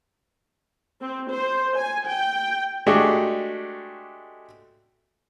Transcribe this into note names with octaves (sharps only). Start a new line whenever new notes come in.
C4
C5
G#5
G5
G#3 A3 D4 F#4 G4